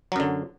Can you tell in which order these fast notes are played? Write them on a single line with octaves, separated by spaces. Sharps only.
F#3 F#2 D3